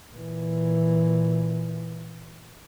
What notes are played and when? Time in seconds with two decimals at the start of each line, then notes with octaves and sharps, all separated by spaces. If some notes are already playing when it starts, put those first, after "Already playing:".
0.13 A#2 E3